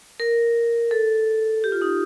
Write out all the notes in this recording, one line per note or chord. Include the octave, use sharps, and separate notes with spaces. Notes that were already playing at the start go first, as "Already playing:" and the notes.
A#4
A4
G4
F4
D#4